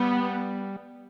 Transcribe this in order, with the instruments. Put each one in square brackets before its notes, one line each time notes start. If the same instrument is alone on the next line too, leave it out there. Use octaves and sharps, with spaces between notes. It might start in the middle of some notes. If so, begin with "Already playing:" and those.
Already playing: [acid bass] G3 [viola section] B3